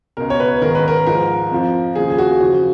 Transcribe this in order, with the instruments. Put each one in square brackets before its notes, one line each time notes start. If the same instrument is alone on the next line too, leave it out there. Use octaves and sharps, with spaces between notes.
[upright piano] C#2 B2 A#4
C#5
B4
G#2 D#3 A#4
B4
A#4
G#2 F3 A#4
F2 F3
D#2 C#3 F3 G#4
G#4
F#4
F#2 C#3 F3